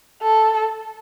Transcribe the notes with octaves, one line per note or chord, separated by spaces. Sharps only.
A4